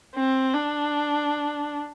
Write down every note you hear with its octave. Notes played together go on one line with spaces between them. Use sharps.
C4
D4